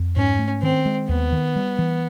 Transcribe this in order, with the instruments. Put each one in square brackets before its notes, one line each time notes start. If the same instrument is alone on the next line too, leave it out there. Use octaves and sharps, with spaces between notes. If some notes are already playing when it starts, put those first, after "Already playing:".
Already playing: [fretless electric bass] F2
[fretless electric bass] G#2 [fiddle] C#4
[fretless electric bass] A3
[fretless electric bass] D#3 [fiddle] C4
[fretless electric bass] G#3
[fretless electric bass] D#2 [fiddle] B3
[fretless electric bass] D#3
G3
E3